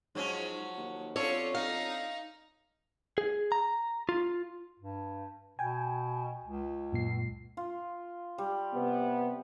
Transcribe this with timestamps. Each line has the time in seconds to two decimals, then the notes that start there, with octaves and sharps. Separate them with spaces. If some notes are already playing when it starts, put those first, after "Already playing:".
0.15 G#2 F3 F#3 C#4
0.77 D#2
1.16 F2 C#4 D4 F4 A4 C#5
1.55 D#4 F5
3.18 G#4
3.52 A#5
4.09 F4
4.80 G2
5.59 B2 G5 G#5
6.44 C#2
6.92 F#2 A#2 C7
7.57 F4
8.38 G3
8.73 C3 B3